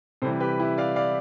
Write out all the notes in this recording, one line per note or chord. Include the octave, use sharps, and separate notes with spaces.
C3 E3 G3 A4 C5
G4 B4
E4 G4
D5 F5
D5 F5